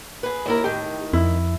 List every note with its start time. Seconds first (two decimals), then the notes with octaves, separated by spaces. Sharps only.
0.23 G#4 B4
0.46 D#2 E4 A#4
0.64 A2 D#3 G4
1.13 F2 E4